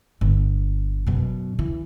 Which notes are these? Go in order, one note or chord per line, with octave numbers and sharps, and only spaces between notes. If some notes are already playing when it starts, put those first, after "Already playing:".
G1
F#2 B2
E3